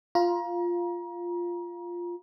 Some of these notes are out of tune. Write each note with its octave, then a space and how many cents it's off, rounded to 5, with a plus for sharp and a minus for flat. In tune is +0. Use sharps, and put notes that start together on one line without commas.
F4 +0 A#5 +35